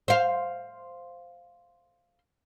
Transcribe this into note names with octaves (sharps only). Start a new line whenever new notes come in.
C5 F5